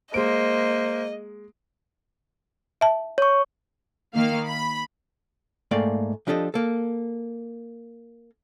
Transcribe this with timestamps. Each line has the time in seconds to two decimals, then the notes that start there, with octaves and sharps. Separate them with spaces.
0.14 G#3 A#3 C5 D#5 D7
2.81 E5 A5
3.18 C#5 C#6
4.14 D#3 A#3 F5
4.47 B5
5.71 G#2 A3 A#3 D5 F5 G5
6.27 F3 D4 G4 A4 D5 D#5
6.54 A#3 A4